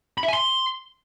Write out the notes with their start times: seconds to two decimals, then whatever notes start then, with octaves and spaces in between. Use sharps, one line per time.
0.18 B5
0.23 E5
0.28 G#5
0.34 C6